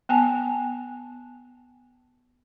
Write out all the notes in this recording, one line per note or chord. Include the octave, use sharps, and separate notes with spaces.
B3 G#5 A5